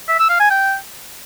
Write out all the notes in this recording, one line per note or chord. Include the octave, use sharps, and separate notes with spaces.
E5
E6
F5
G#5
G5